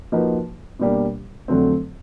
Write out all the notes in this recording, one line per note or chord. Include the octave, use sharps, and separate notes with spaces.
F3 A#3 D#4 F#4 B4
B2 G3 A#3 D4 G4
F2 D3 F#3 A3 C4